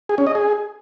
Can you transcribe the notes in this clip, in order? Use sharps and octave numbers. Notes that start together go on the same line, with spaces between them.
G#4
C#4
D#5
G#4